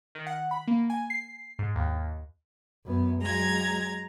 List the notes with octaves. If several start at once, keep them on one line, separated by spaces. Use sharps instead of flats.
D#3
F#5
B5
A#3
G#5
C7
G#2
D#2
F#2 B3
F#3 G#3 A#5 G#6